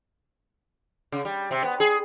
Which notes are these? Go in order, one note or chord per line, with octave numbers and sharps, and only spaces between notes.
C#3
G3
C3
B3
G#4